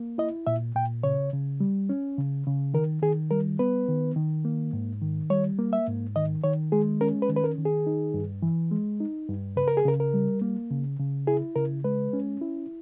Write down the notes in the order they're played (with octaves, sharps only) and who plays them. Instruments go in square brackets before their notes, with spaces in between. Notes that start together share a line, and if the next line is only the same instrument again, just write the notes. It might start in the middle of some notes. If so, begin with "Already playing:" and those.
Already playing: [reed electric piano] A#3
E4 D#5
A#2 E5
A#2 G5
C#3 C#5
C#3
G3
C#4
C#3
C#3
D#3 A#4
D#3 G#4
G3 A#4
B3 B4
D#3
D#3
A#3
G#2
D#3
G3 C#5
A#3
E5
G#2
D#3 D#5
D#3 C#5
G#3 G#4
C#4 A#4
B4
D#3
B4
A#4
D#3
G#4
D#4
G2
E3
G#3
D#4
G2
C#3 B4
A#4
G#4
C#3 A#4
A#4
G3
A#3
C#3
C#3
E4 G#4
C#3 A#4
G#3 B4
C#4
E4